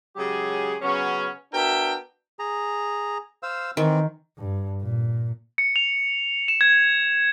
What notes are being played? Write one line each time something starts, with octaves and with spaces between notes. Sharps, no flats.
C#3 F#3 G#3 G4 G#4
C#3 F#3 B3 C#4
B3 D4 F#4 A#4 E5 G5
G#4 A#5
C5 F5 E6
D#3 E3 C4
G2
A#2
C#7
F7
E7
G#6